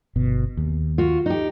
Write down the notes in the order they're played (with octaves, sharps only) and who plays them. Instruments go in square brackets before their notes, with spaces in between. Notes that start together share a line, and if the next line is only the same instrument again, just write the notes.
[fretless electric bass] G1 B2
D#2
[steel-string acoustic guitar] F4 F#4
D#4 G4